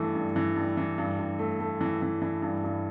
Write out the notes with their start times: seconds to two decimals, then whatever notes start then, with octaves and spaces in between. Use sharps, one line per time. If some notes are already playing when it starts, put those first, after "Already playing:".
Already playing: G2 E3 A3
0.15 G2
0.36 E3
0.56 G2
0.77 E3
0.98 G2
1.19 G2
1.39 A3
1.60 A3
1.81 E3
2.02 E3
2.22 E3
2.42 G2
2.64 G2